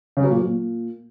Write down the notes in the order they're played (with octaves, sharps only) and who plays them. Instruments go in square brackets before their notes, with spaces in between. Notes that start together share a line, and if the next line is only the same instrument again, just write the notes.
[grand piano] C#3
F#3
A#2
F#3
A#2